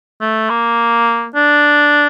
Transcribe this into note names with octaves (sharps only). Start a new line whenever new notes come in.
A3
A#3
D4